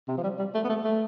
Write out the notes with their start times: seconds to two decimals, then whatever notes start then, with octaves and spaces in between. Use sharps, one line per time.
0.08 C3
0.18 F3
0.23 G3
0.39 G3
0.54 A3
0.64 B3
0.70 A3
0.84 A3